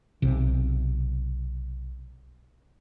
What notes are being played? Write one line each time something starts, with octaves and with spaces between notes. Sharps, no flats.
B1 C3